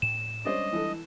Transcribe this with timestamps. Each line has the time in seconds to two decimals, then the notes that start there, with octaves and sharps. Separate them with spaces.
0.02 A2 E7
0.45 G3 G#3 C#4 D4 C5 D5 D#5
0.72 E3 A4